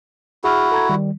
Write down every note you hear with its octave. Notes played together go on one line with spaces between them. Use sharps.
E4 F#4 G#4 F6
A4 A#5 G#6
D#3 G3